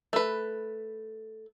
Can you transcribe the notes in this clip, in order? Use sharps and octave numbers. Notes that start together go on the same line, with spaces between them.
A3 B4